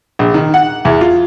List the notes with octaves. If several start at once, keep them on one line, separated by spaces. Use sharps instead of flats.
A#1
D#3
F#5
E2
F4